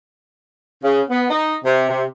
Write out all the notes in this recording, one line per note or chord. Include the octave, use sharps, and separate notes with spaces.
C#3
B3
D#4
C3
C3